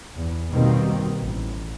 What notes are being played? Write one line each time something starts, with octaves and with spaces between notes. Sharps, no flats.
E2
B2 D#3 G3 A#3 C4
A1